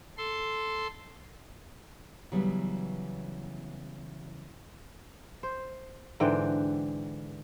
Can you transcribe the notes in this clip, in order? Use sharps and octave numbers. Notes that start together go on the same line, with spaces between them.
A4 C6
C#3 E3 F#3 G3 B3
C5
G#2 D3 E3 G5